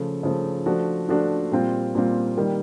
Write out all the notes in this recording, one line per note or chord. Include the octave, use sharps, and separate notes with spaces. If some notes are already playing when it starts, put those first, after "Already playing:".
Already playing: C#3 F3 A3
C#3 F3 A3
F3 A3 D4 F#4
F3 A3 D4 F#4
A#2 G3 C4 F4
A#2 G3 C4 F4
D#3 G3 A#3